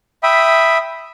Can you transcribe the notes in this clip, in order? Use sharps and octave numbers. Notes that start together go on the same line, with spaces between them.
E5 G5 B5 D#6